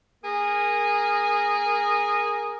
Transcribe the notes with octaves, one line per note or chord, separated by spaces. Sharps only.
A#3 G#4 A#4